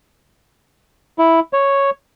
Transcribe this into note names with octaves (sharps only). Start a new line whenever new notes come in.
E4
C#5